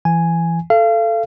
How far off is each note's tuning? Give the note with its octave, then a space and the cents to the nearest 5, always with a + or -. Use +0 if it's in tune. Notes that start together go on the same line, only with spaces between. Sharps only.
E3 +25 G#5 +0
A4 +0 F5 -35